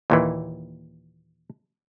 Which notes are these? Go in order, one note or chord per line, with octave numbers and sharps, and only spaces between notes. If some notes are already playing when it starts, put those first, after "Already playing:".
D#2 A#2 E3